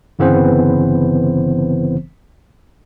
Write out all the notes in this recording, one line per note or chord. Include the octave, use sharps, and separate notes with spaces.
G1 C#3 E3 B3 C4 C5